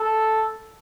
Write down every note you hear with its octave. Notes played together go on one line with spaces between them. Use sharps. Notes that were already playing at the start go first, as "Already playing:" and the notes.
Already playing: A4